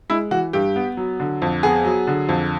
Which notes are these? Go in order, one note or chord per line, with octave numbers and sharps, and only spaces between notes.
G#3 E4
E3 F#4
G2 G4
B3
F#3
D3
F2
B3 G#4
F#3
D3
F2